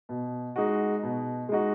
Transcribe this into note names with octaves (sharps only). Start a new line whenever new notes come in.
B2
G#3 D#4 F#4
B2
G#3 D#4 F#4